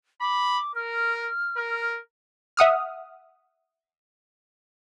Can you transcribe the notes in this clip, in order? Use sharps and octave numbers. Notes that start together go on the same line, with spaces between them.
B5 D6
A#4 F6
A#4
E5 F#5 D#6 F6